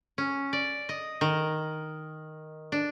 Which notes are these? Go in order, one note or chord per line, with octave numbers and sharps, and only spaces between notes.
C#4
D5
D#5
D#3
D4